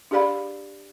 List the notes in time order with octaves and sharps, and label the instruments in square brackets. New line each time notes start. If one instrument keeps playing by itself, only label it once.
[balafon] D4 G4 G#4 D5 F5 B5